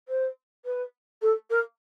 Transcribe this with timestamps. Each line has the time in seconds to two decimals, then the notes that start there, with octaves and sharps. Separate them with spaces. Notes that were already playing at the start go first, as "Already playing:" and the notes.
0.08 C5
0.65 B4
1.21 A4
1.50 A#4